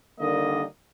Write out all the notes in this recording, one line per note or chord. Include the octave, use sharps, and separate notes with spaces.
D3 D#3 G3 A#3 D#5